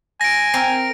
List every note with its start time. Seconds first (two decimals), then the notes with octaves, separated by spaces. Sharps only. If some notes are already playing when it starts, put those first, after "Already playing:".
0.21 G#5 A#6 D7
0.54 C4 A#4